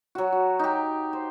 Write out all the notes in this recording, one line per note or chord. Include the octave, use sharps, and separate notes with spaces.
F#3 F#4
F#4
D#4 G4
C5